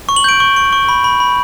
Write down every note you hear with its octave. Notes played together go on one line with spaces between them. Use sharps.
C#6
F#7
G6 D7
C#6
C#6
C#6
B5
B5
B5